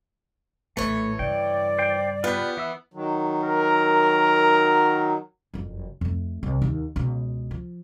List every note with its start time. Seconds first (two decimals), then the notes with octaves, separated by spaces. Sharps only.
0.77 A#1 A2 E3 A3 C#5
1.19 G2 C#3 D5 G5
1.79 C5 G5
2.24 B3 F4 G4 B4
2.57 E3 E5 E6
2.94 D#3 F#3
3.43 A#4
5.54 F#1 F2
6.01 F2 A3
6.43 C2
6.62 D#2 D#3
6.96 C#2 B2
7.51 F3